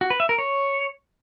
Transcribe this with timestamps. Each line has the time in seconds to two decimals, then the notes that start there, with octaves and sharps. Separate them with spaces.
0.01 F#4
0.10 B4
0.20 E5
0.29 A#4
0.38 C#5